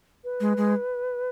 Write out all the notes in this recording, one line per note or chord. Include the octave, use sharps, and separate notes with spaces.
B4
G#3
G#3